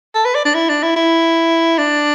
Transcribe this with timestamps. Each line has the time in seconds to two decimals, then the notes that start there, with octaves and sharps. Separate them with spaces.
0.14 A4
0.25 B4
0.35 D5
0.45 D4
0.55 E4
0.69 D4
0.83 E4
0.96 E4
1.78 D4